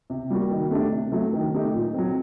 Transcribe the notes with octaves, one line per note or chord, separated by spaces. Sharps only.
C3
G3 A#3 F#4
D#3
A3 D4 G4
C3
F#3 A3
D#3
A3 D#4 G4
A#2
F#3 C4